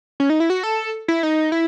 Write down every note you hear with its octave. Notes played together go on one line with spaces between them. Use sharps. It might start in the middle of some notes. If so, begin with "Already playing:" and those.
C#4
D#4
E4
F#4
A4
E4
D#4
E4